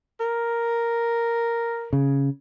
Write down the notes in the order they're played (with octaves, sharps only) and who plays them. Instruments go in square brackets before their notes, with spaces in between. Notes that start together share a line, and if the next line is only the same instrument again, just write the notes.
[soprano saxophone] A#4
[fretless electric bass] C#3